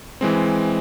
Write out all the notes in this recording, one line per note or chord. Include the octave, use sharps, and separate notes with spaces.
E3 G#3 C4